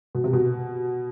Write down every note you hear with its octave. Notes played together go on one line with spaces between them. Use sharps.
B2
C3
B2